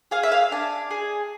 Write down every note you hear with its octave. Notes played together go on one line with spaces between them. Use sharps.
G#4 F5
E5
F5
D4 G#5
G#4